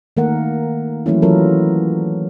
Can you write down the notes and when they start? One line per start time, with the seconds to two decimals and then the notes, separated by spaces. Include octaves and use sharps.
0.17 D#3 A3 A#3 A#4 F#5
1.06 E3 F#3 A3 A#3 C#4 E4
1.22 E3 F#3 C#4 F4 A4 A#4